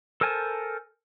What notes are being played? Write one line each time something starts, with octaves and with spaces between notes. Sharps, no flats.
A4 A#4 C5 G#5 A5